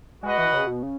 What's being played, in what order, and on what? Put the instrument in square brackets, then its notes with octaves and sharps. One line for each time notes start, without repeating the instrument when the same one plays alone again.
[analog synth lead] G#3 [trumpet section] F#4 B4 D#5 F#5
[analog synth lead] E3
C#3
B2
C#3